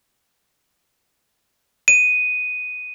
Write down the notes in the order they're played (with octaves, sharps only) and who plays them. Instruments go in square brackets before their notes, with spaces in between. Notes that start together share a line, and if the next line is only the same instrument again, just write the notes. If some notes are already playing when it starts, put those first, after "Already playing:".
[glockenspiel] D#7